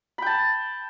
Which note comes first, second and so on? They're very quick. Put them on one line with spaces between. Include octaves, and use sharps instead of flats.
B5 G5 A5